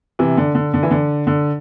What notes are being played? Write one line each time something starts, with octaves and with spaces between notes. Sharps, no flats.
C3 E3
D3
D3
D3
E3
D3
D3